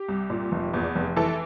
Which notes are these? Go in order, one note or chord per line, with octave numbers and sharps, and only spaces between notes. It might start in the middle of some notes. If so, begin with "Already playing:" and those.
Already playing: G4
C2
A#2
F1
E2
F1
E3 A4